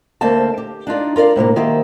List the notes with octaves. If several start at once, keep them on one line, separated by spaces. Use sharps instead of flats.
D2 A3 A#3 C4 D#5 A5
G4
D4 D#4 F4 D5
F4 A#4 B4 D5 F5
A2 C3 A3 A#3
B2 D#3 A#3 G4 C5 E5